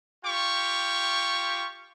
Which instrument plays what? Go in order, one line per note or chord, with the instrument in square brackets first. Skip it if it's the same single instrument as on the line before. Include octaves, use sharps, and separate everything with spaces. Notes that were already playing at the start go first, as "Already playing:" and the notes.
[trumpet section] F4 G4 G5 C#6